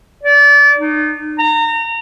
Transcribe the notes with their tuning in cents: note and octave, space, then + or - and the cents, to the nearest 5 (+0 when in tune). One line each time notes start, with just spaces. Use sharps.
D5 -30
D#4 -35
A#5 -30